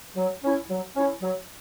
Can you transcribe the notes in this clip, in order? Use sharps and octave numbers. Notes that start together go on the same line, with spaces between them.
F#3
C#4 E4
F#3
C#4 E4
F#3